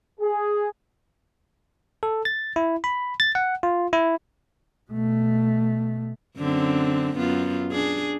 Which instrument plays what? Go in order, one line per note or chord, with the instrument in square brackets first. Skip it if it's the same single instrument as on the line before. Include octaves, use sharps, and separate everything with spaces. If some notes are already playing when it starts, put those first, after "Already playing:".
[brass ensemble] G#4
[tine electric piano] A4
A6
E4
B5
A6
F#5
F4
E4
[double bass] B2 A3
[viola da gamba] F#2 D3 C4
F#2 B3 F4
D4 G#4